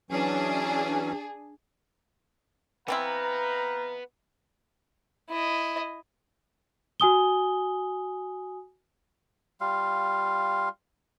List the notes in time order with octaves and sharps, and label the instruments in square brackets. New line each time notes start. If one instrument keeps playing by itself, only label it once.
[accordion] E3 F#3 C#4 [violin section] D4 G#4
[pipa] E3 C4 E4 [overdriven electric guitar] B3 [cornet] B4 [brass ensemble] F5 G5 A#5
[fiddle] E4 D#5
[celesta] F#4 G#5 D#6 G7
[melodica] G3 F4 F5